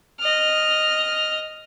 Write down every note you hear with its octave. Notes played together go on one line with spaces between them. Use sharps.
D#5 F6